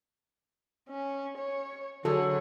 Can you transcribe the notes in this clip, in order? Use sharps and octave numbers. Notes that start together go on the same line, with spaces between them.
C#4
C#5
D3 F#3 F#4 G#4 A4 C#5